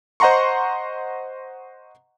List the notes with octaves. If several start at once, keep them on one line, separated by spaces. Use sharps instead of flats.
C5 D#5 F#5 A#5 C6 C#6